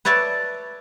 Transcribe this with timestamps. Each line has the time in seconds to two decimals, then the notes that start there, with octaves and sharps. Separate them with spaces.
0.05 B4 C#5 D5 E5 A5